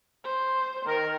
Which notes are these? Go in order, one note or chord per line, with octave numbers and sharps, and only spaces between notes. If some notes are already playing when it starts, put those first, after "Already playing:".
C5
D#3 A#4